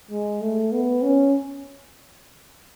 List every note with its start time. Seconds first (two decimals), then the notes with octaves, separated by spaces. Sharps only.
0.11 G#3
0.41 A3
0.72 B3
1.02 C#4